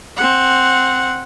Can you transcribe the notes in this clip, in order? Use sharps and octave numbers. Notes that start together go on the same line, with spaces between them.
C4 F#5